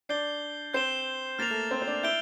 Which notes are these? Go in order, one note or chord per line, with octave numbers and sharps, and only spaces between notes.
D4 D5 G6 C7 G7
C4 C5 G6 C7 E7 G7
A#3 A#4 F6 A6 C7 F7
A3 A4
C4 C5
C5
D4 D5
E4 E5 G6 D7 G7